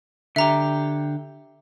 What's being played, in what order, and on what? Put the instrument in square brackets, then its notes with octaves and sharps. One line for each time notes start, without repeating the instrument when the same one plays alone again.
[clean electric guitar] D3 G4 [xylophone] E5 A#5